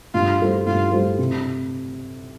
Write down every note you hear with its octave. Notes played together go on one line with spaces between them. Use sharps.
G2 F4
G3 F4 A4 C5
G2 F4
G3 F4 A4 C5
C3